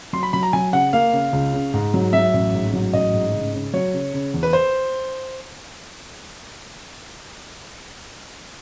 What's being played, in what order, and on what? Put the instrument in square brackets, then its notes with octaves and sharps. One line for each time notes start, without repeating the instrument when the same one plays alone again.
[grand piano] F#3 C6
B5
F#3 B5
A#5
F#3 G#5
C#3 F#5
A#3 F5
C#3
C#2
C#3
G#2
F#3
F#3 E5
A1
G#2
F#3
A1 D#5
G#2
C#3
C#3
F#3 C#5
C#3
C#3
E2
B4
C5